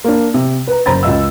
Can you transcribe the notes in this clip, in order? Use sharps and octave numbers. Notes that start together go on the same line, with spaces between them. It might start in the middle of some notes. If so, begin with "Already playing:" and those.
A#3 D4
C3
B4 A#5
F#1 C5 A#5 B5 A6
C#2 D#5 E6